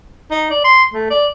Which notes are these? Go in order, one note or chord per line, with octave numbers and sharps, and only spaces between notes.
D#4
D5
C6
A3
D5